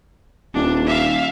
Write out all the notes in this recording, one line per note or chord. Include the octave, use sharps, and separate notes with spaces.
D#1 D4
E5 F5